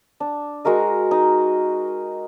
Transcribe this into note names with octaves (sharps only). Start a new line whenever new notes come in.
D4
G#3 F#4 A#4 D#5
D#4